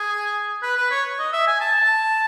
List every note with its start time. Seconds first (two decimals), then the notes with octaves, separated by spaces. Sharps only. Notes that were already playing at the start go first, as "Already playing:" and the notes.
Already playing: G#4
0.62 B4
0.77 B4
0.91 C#5
1.19 D#5
1.32 E5
1.47 G#5
1.61 A5
1.75 A5